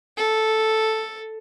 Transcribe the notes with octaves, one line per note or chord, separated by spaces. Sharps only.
A4